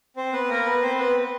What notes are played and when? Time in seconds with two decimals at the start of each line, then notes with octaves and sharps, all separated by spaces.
0.16 C4 C5
0.32 B3 B4
0.49 A#3 A#4
0.66 B3 B4
0.82 C4 C5
0.98 B3 B4